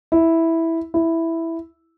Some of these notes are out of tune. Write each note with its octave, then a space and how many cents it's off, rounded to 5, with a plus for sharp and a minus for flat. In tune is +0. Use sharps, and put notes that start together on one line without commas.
E4 -5
E4 +0